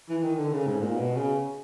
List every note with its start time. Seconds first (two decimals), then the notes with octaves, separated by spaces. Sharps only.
0.09 E3
0.23 D#3
0.38 D3
0.53 C#3
0.67 G#2
0.82 A#2
0.97 B2
1.16 C#3